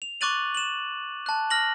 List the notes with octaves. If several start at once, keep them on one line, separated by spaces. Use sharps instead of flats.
F7
C#6 D6 F#6 A6 D#7 F#7
E7 F#7
A5 F#6
F6 A#6 F#7